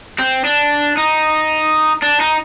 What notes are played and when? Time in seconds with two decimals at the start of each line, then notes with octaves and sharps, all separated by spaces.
0.19 C4
0.45 D4
0.97 D#4
2.02 D4
2.20 D#4